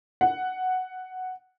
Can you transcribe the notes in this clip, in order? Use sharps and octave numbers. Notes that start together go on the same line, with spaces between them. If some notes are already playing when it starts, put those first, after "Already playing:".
F#5